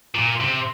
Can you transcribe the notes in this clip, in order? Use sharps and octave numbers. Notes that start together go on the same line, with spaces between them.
A#2
C3